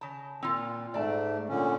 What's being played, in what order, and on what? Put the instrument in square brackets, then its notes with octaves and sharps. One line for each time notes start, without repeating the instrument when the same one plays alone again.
[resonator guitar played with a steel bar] C#3 A5
[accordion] A#2 [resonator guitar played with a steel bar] C4 F4
[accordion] G#2 A3 [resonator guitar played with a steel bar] D5 A5
[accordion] A#2 D3 C#4